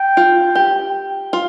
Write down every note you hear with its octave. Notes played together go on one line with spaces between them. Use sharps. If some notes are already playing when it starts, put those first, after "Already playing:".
Already playing: G5
F4
G4
F4